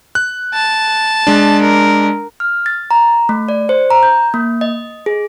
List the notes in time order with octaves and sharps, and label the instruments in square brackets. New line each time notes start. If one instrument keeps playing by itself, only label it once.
[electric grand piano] F#6
[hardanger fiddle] A5
[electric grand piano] G#3 D4
[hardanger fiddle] A#4
[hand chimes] F6
A6
A#5
A3
D5
C5
A#5
G6
A#3
D#5
G#4